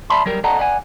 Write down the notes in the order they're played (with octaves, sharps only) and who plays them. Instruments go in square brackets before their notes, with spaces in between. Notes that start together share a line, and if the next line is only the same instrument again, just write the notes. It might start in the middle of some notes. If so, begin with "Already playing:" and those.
[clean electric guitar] D5 E5 A5 B5 C6
F#3 G3 A#4
A4 D5 D#5 F#5 A5 A#5
D5 F#5 G#5